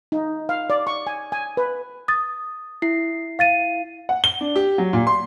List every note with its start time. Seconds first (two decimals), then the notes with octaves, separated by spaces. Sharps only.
0.12 D#4
0.49 F5
0.70 D5
0.87 C#6
1.07 G#5
1.32 G#5
1.57 B4
2.08 D#6 A6
2.82 E4 C7
3.39 F5 A6 D#7
4.09 F#5
4.24 G7
4.41 D4
4.56 G4
4.78 F#3
4.93 A#2
5.07 C6